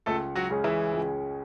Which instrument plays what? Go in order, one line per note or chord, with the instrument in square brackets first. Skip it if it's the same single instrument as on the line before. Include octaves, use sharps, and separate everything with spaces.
[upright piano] C#2 [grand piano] A3 A4
[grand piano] F#3 F#4
[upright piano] C#3 G#3 C#4 G#4
[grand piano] E3 E4
[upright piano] C#2